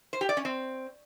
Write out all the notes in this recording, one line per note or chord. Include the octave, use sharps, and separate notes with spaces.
C5
G4
D5
C#4
C4